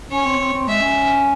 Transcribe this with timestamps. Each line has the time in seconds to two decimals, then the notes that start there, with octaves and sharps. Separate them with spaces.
0.11 C#4 C#5
0.25 C4
0.39 C4
0.53 C4
0.67 G#3 E5
0.82 C#4